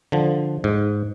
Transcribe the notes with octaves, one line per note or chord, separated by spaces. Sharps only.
D3 F3
G#2